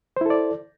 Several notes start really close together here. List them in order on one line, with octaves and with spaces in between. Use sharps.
C5 E4 A4 D5